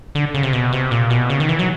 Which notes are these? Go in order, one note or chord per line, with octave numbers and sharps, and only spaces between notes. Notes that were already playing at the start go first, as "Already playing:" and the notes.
D3
C#3
C3
B2
C3
A#2
B2
C#3
D#3
E3
F#3